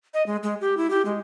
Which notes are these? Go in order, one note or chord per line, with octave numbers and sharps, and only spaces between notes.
D#5
G#3
G#3
G4
E4
G4
G#3